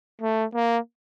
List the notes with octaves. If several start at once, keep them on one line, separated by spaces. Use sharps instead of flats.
A3
A#3